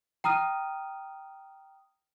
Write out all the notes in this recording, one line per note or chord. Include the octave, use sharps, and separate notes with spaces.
G5 A#5 D#6 F6 D#7